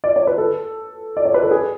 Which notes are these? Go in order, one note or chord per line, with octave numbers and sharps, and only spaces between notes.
D5
C#5
B4
A4
D5
C#5
B4
A4
G#4